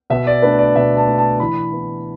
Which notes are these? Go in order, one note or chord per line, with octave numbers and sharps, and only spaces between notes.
B2 E5
D5
A3 D4 B4
D5
B2 E5
A5
A3 D4
A5
E3 B5
B3 E4